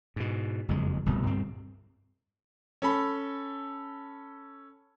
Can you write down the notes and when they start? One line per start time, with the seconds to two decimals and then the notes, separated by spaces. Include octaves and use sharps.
0.16 G#2 B2
0.68 F#1 F2 G#3
1.06 D1 G1 C2 B2
1.26 D2 G2 C4
2.82 C#4 A4 B5